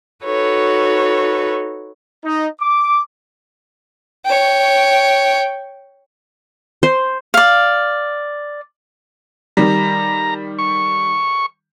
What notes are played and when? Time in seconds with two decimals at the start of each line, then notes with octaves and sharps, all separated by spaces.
0.25 D#4 F#4 A4 B4 C#5
2.25 D#4
2.61 D6
4.25 C#5 G5
6.83 C5
7.34 D5 F5
9.57 D#3 G3 A#5
10.59 C#6